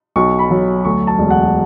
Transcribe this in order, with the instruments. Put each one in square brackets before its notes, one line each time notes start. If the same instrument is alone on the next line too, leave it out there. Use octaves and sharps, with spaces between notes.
[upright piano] B1 C#6
B5
F#3
D2 C#6
A5
E1
F#5